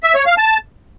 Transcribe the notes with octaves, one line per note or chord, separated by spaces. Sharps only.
E5
C#5
F5
A5